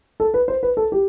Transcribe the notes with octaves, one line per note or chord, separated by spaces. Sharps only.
A4
B4
C5
B4
A4
G4